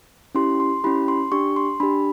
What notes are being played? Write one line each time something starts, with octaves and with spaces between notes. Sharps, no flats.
C#4 E4 G4 C6
C6
C#4 E4 G4 B5
C6
D4 G4 C#6
C6
D4 G4 B5